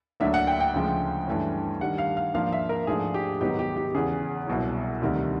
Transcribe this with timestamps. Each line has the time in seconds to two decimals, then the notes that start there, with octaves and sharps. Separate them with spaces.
0.20 D2 D3 F#3 A#3 D4 E5
0.34 F#5
0.47 G5
0.60 G5
0.74 D2 C#3 F3 G#3
1.27 G2 E3 A3 C#4
1.81 G2 D#3 G3 F#5
1.98 F5
2.17 F5
2.34 G#2 F3 A#3 D4 F5
2.52 E5
2.69 A#4
2.87 G#2 F3 A3 D4 G#4
3.14 G4
3.41 G#2 D#3 F#3 B3 D#4 G4
3.59 G4
3.76 G4
3.95 E2 C#3 E3 G#4
4.47 C2 B2 F#3
5.02 D2 C3 D#3 G3